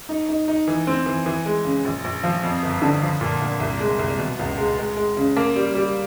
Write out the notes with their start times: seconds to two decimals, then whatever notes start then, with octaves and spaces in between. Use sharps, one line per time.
0.09 D#4
0.29 D#4
0.48 D#4
0.68 E3
0.87 C4
1.06 E3
1.26 E3
1.46 G#3
1.65 C#3
1.85 A#1
2.04 A#1
2.24 F3
2.43 F2
2.63 G1
2.82 D3
3.02 F3
3.21 A#2
3.42 A#2
3.60 C2
3.80 G#3
3.99 C2
4.19 B2
4.39 C#2
4.58 G#3
4.78 G#3
4.97 G#3
5.17 C#3
5.37 A#3
5.56 G3
5.75 G3